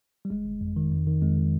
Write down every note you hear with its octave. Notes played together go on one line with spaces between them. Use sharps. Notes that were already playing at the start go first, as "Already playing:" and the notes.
G3
G1 G#3
G1
F2
D#3
F2
D#3
F2 G#3
D#3